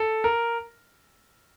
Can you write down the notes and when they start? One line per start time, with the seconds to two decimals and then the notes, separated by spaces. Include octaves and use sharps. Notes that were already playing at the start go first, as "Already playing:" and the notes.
Already playing: A4
0.24 A#4